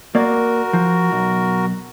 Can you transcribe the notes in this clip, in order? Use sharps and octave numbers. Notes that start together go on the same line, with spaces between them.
A#3 F#4 A#4 D5
F3
B1